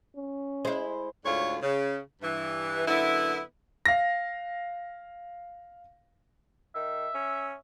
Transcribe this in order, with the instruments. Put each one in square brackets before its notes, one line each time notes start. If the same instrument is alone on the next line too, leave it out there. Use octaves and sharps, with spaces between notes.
[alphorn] C#4
[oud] G#3 E4 [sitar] C5
[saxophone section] D2 G#2 D3 F4 C#5
C#3
G2 E3
F#2 D3 B3 E4
[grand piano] F5 A#6
[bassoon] D#3 [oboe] E5
[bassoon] C#4